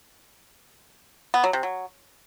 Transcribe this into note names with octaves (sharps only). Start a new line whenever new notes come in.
B3
F#3
C3
F#3